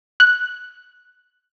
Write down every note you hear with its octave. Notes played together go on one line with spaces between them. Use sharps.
F#6